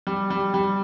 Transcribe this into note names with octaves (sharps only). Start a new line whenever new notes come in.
G3
G3
G3